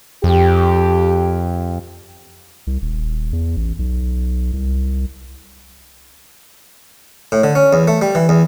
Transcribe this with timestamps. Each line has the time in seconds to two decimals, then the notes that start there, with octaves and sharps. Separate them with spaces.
0.24 F2 G4
2.67 C2
2.82 D#1
3.33 E2
3.56 A1
3.79 B1
4.53 C2
7.32 A2
7.44 D3
7.55 C#4
7.73 E2
7.88 A3
8.02 G3
8.15 E3
8.29 E2